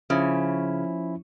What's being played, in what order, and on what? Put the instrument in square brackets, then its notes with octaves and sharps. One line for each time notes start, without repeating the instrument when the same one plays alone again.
[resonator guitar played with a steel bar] C#3 [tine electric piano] F3 C#4 E4